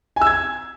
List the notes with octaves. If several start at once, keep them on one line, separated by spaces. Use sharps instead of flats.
G#5
E6
G#6